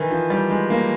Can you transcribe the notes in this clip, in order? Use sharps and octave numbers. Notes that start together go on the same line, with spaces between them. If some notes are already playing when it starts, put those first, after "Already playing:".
Already playing: D#3 E3
F3
G3
G#3
A#3